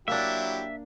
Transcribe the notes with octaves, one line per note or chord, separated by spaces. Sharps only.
F#3 A#3 D4 E4 G4 E5